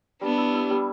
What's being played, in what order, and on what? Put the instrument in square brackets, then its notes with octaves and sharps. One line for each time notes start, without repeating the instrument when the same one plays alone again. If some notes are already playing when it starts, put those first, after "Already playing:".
[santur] G3 [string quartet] B3 D4
[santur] E4
E4
G3